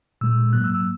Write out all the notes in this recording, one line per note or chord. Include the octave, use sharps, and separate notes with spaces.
A#2 G#3 E6
G#2 F#3 A#3 F#6
E6
E6